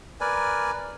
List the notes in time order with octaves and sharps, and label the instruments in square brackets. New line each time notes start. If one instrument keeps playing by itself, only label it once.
[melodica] A#4 B4 D5 G#5